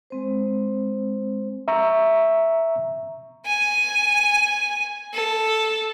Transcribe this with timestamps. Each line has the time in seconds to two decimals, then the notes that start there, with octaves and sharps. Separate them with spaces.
0.10 G#3 C4 C5
1.68 E5 A#5 C#6 E6
3.45 G#5
5.13 A4